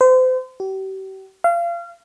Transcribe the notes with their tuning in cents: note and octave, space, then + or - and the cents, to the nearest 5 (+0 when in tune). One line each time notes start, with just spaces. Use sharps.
C5 -35
G4 -40
F5 -30